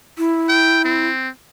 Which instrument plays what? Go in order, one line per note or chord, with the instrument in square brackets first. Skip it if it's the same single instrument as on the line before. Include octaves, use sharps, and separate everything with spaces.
[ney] E4
[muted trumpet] G5
C4